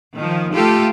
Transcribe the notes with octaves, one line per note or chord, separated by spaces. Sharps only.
D#3 F3
A3 F4 G4 A4